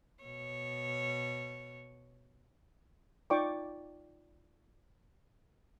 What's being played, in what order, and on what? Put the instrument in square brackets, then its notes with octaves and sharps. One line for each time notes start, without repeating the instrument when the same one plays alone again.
[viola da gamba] B2 C#5
[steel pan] D#4 F4 D5 G5 C#6 D6